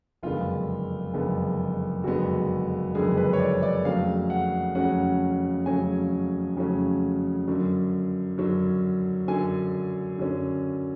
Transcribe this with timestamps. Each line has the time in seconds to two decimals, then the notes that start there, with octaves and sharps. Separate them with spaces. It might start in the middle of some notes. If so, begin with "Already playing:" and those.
0.23 F#1 F2 D3 G#3 B3 F4
1.14 F#1 F2 D3 G#3 B3
2.04 F#1 F2 D3 G#3 B3 F#4
2.95 F#1 F2 D3 G#3 B3 G#4
3.17 B4
3.33 C#5
3.39 D5
3.63 D5
3.85 F2 C#3 F#3 A3 C#4 F5
4.30 F#5
4.75 F2 C#3 F#3 A3 C#4 F#5
5.66 F2 C#3 F#3 A3 C#4 G#5
6.57 F2 C#3 F#3 A3 C#4
7.47 F#2 D3 F#3 C#4
8.38 F#2 D3 F#3 C#4
9.28 F#2 D3 F#3 C#4 G#5
10.18 F#2 D3 F#3 C#4